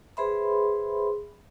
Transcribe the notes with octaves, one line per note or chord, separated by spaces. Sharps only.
G#4 B4 C5 E5 B5 C6